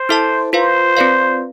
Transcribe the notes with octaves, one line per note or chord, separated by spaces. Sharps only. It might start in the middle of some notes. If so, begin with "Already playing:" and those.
Already playing: C5
E4 A4 E5 A5
F4 B4 C5 F5
C4 F4 B4 D5 F5